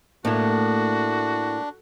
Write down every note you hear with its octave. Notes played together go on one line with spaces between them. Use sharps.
A2 A3 A#3 D4 E4 F#4